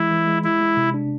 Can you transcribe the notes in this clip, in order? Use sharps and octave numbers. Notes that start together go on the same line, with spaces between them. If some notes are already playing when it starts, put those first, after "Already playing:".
Already playing: E3 G#3 E4
E3
G#3
G#3 E4
G#3
C3
D4